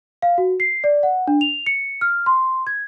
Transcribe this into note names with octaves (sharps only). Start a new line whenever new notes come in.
F5
F#4
C7
D5
F#5
D4
F7
C#7
F6
C6
G#6